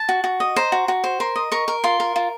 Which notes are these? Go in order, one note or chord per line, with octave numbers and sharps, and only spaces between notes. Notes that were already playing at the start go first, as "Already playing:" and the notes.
Already playing: A5
F#4
F#4
D#5
C5 A#5
F#4
F#4
C5
A#4 C6
D#5
A#4 C#6
A#4
F4 C6
A#4
F4